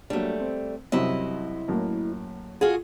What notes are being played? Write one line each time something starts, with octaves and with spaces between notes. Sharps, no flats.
F#3 G3 A3 A#3 D4
C4
C2 F#2 C3 E4 D#5
F#2 A2 A#3
F4 F#4 G#4